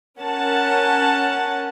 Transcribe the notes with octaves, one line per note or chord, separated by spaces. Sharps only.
C#4 A#4 F#5 A5